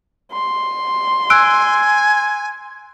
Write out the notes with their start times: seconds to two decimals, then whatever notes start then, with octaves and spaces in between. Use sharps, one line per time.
0.32 C6
1.30 G#5 E6 F#6 D7